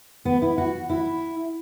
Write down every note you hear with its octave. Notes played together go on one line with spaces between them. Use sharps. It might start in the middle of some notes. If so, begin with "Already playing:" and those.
B3
E4
F#4
E4